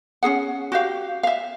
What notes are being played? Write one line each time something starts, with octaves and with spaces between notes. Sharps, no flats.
C#4 D#4 G#4 F#5
F#4 G4 F5
E5 F5